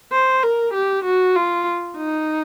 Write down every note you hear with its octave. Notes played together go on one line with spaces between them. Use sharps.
C5
A#4
G4
F#4
F4
D#4